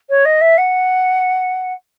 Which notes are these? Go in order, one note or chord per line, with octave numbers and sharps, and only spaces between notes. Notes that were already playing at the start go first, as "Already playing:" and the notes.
C#5
D#5
E5
F#5